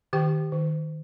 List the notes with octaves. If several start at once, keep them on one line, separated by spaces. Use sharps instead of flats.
D#3 G4 G5
D#3